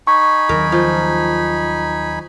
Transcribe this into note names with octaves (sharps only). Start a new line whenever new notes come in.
D#4 G#5 B5 C#6
D#2 D#3 F#3 A#4
F3